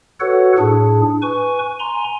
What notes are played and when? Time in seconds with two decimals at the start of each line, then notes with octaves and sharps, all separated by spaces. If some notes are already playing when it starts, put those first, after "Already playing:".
0.20 F#4 A4 B4 C#5 F#5
0.58 A2 D4 G#4
1.22 B4 G#5 C#6
1.80 G#5 A#5 C6